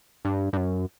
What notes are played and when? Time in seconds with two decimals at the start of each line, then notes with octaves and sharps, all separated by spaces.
0.25 G2
0.53 G2
0.57 F#2